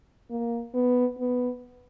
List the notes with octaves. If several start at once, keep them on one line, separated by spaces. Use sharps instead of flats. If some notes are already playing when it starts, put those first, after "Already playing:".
A#3
B3
B3